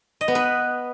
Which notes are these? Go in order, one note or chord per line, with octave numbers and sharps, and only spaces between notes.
D#5
B3
B4